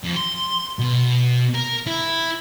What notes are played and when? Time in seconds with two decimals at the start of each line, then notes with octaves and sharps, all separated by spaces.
0.04 F2
0.16 C6
0.79 B2
1.55 A#4
1.87 E4